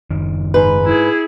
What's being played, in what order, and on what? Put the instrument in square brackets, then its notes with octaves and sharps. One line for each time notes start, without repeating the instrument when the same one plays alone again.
[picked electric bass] F#1 D#3
[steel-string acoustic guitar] G#2 B4
[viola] E4 G#4